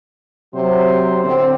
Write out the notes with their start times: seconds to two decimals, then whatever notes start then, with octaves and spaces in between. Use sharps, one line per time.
0.54 C3 F#3 C5
1.24 A2 D3 C4